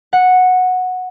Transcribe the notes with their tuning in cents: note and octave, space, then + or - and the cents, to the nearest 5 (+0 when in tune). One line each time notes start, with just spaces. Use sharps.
F#5 -10